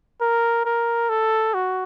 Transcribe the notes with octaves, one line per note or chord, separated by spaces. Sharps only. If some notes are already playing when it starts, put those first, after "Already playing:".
A#4
A#4
A4
F#4